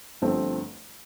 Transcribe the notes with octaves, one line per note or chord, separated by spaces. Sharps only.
G1 G2 F3 A3 C4